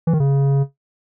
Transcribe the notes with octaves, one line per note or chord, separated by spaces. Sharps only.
E3
D#3
C#3